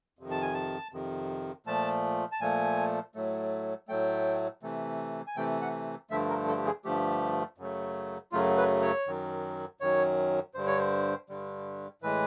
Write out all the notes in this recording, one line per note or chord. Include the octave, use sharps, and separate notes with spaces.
F2 C3 D#3
A5
G#5
A5
F2 C3 D#3
A#2 F3 A3 A5
A5
A#2 F3 A3 G#5
A2 F#3 A3
A2 F#3 A3 G5
C3 E3 A3
G#5
C3 E3 A3 G5
F#5
G2 D3 F3 A3 E5
A#4
A4
G4
G#4
G2 D3 F3 A3 G4
F#2 C#3 F#3 A3
F#2 C#3 F#3 A3 F4
B4
C#5
F#2 D#3 F#3
F#2 D#3 F#3 C#5
G2 D3 G3 C5
C#5
C5
G2 D3 G3
A2 E3 G#3 B4